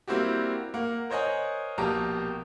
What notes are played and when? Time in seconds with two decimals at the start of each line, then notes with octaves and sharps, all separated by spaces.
0.08 G3 A#3 C4 E4 F#4 G4
0.74 A#3 F#5
1.10 A#4 C5 C#5 D#5 F#5 G#5
1.78 A#1 B2 A#3 G4 A5 A#5